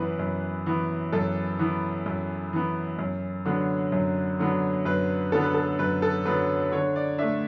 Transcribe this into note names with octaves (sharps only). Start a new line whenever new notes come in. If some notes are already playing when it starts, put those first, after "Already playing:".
Already playing: F#2 E3 B3 B4
F#2
E3 B3
F#2 A4
E3 B3
F#2
E3 B3
F#2
D3 F#3 B3
F#2
D3 F#3 B3
F#2 B4
D3 F#3 B3 A4
B4
A4
F#2 B4
A4
D3 F#3 B3 B4
D3 C#5
D5
A3 D4 E5